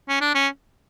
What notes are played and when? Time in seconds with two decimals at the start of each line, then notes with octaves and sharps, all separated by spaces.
0.09 C#4
0.21 D4
0.35 C#4